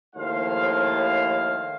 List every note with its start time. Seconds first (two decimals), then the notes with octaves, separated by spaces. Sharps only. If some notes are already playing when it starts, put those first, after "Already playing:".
0.16 D#2 A2 F3 C5 F5